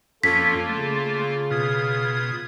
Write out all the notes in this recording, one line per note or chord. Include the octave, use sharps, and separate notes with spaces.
F2 A#3 C#4 F4 A4 B6
C#3 A3
B2 F4 D#6 G#6